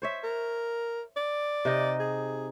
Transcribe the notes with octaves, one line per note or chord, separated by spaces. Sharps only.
C5 C#5 E5
A#4
D5
C3 D#4 D#5
G#4